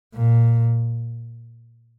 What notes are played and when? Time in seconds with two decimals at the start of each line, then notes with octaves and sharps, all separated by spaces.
0.15 A#2